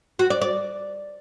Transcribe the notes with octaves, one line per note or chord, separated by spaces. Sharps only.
F#4
D5
D5